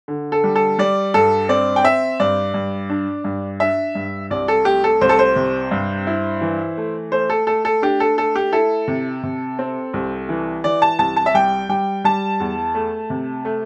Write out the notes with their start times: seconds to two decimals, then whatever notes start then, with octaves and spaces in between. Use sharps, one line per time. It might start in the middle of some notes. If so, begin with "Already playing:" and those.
0.08 D3
0.32 A4
0.44 G3
0.55 A4
0.79 G3 D5
1.14 G2 A4
1.49 C4 D5
1.76 G5
1.84 C4 E5
2.20 G2 D5
2.54 G2
2.90 D4
3.24 G2
3.60 D4 E5
3.95 G2
4.31 C2 D5
4.48 A4
4.65 A3 G4
4.84 A4
5.01 C2 C5
5.09 A4
5.19 C5
5.36 C3
5.71 G2
6.07 E4
6.41 E3
6.77 A3
7.12 A3 C5
7.30 A4
7.47 A3 A4
7.65 A4
7.82 D4 G4
8.00 A4
8.18 A3 A4
8.36 G4
8.53 E4 A4
8.88 C3
9.23 C3
9.59 C4
9.94 C2
10.29 E3
10.64 E3 D5
10.82 A5
10.99 C2 A5
11.16 A5
11.26 E5
11.34 G3 G5
11.69 G3 G5
12.04 G3 A5
12.40 E2
12.75 A3
13.10 C3
13.45 A3